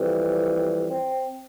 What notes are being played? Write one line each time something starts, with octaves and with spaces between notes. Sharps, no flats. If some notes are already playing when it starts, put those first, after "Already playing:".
Already playing: F2 E3 G3
C4